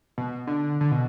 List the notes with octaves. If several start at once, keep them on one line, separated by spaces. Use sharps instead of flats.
B2
D3
D3
B2